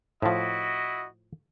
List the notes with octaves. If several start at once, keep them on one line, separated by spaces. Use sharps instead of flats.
A2 F3 E4 F#4 D#5